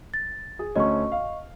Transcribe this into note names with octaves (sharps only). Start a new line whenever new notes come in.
A6
G#4
D2 A3 C#4 D#5 C#6
F5